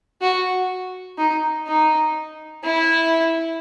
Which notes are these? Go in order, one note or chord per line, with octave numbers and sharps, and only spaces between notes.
F#4
D#4
D#4
E4